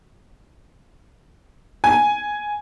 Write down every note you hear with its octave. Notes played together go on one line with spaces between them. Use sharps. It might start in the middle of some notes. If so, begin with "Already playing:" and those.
G#5